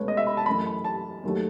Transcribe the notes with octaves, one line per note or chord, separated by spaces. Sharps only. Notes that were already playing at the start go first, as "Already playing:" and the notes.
Already playing: C#2 B2 A3 B4 C#5
D#5
E5
B5
A5
F#2 E3 A3 B5
B5
A5
D#2 D#3 F#3 A3